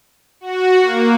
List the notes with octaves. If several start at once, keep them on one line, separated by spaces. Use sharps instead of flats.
F#4
A#3